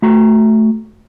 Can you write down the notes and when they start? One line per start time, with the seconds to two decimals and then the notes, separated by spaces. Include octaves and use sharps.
0.02 A3 F#4 A#5